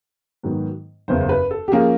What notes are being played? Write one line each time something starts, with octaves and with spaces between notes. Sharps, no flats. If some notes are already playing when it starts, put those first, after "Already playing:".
G#2 D#3 F#3 B3
F#1 E2 C#3 C5
C5
B4
A4
G4
F3 A#3 C#4 G#4